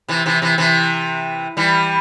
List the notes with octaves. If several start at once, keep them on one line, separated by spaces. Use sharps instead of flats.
C3 E3
C3 E3
C3 E3
C3 E3
E3 G3